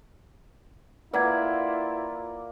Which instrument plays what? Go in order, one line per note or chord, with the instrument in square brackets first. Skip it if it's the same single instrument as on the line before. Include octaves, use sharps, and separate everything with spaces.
[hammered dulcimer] A#3 D5 [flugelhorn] E4 [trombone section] F4 [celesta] B4 F#5 G#6